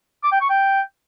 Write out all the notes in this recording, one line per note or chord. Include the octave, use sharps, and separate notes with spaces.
D6
G5
C#6
G5